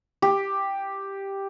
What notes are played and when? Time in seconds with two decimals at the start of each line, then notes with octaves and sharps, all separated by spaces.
0.22 G4